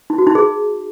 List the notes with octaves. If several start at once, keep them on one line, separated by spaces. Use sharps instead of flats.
D#4
F#4
D#4
G#4